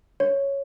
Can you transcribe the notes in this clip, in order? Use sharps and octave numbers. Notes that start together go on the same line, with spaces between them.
C#5